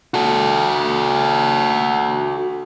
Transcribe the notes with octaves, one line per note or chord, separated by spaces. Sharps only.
F#4 A4